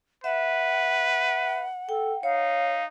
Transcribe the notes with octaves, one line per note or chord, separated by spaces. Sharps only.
B4 E5 F#5
A4 G5
D#4 C#5 F5